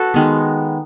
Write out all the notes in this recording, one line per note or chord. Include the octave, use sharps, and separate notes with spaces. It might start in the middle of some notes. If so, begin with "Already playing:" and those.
Already playing: F#4 A4 B4
D#3 G#3 B3